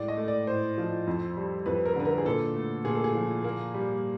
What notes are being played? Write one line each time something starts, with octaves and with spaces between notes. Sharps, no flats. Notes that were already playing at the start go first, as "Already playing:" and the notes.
Already playing: A2 G#3 D5
D#5
A3
D5
A2 C5
F3
F2
G3
F2 B4
A#4
D3 B4
A#4
G#4
A#2 A4
A3
A#2 G#4
A4
G#4
F3
A#3
G3